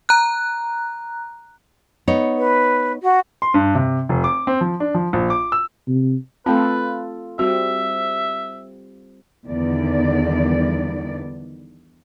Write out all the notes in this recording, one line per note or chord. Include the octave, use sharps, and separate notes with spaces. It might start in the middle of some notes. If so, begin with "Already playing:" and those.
A#5 F#6
B3 D#4 C#5
B4
F#4
C6
G2
C3
F1
D6
C4
F3
D4
F3
A#1
D6
E6
C3
A3 C4 F4 A4 B4
G3 C4 F#4 E5
E2 D3 D#3 G3 B3 D5